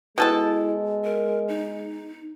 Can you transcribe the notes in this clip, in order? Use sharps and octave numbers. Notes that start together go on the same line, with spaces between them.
B2 G#3 E4 A4 A5
A#4
D#4